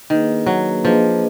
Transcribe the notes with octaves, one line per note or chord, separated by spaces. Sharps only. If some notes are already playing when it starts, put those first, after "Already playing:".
D#3 A#3 D4 G#4 B4 D#5
F#3
F3 A#3 D4 G#4 B4 D#5